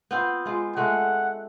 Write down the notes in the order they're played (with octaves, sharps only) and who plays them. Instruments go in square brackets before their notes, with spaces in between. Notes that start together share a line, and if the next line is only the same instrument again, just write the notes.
[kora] B3 C4 F4
G#3 F4
[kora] G#3 A3 D4 [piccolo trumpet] F#5